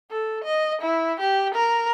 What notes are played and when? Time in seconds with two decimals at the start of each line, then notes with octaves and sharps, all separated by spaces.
0.11 A4
0.44 D#5
0.81 E4
1.20 G4
1.55 A#4